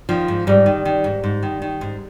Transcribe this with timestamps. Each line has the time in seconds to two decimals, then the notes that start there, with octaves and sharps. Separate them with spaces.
0.09 D#3 F3
0.28 G#2
0.47 G#2 G3
0.66 D#3
0.85 D#3
1.04 G#2
1.24 G#2
1.43 D#3
1.62 D#3
1.81 G#2